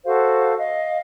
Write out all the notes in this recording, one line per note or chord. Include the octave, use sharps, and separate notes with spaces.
F#4 A4 C5 F5
D#5 F5